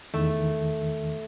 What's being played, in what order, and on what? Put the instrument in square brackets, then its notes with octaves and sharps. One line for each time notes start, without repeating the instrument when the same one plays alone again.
[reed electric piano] E2 D#3 [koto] A3